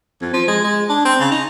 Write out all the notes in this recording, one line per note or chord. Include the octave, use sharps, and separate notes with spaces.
F2
F3
G#3
G#3
D4
C4
C#3
D#4